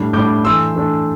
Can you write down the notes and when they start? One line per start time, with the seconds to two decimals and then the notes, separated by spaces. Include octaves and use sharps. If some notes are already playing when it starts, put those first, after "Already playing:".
Already playing: A2 G3 D4
0.13 A2 G3 D4 D6 G6
0.44 E3 A3 D4 C6 E6
0.75 E3 A3 D4